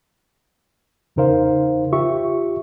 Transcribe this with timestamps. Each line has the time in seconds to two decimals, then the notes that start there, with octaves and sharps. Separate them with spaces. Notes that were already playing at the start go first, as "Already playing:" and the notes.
1.16 E2 C#3 D#4 A#4 C5 F5
1.92 F4 G4 E5 C#6